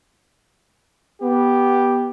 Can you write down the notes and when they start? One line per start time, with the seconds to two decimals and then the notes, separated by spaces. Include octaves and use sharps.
1.22 B3 G4